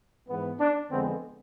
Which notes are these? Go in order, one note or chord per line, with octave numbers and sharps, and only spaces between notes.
G#2 E3 B3
D4
F2 D3 G#3 B3 C4